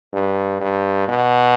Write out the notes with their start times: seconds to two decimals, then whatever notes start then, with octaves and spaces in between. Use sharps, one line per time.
0.13 G2
0.60 G2
1.08 B2